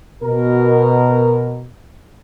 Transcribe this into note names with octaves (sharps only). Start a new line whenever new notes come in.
B2 A#4